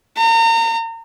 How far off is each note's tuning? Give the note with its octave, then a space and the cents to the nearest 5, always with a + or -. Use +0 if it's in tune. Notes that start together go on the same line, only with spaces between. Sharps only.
A#5 -35